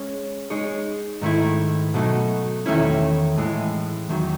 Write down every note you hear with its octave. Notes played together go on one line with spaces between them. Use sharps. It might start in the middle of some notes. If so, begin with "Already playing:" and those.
Already playing: G#3 C#4 G#4 C#5
G#3 D#4 G#4 C#5
G#2 D#3 A3 E4
B2 F#3 A3 D#4
E2 D#3 A3 C#4 E4
A2 E3 G#3
E2 D#3 F#3